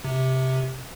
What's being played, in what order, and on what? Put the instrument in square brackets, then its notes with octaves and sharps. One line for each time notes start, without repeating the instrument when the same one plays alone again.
[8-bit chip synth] C3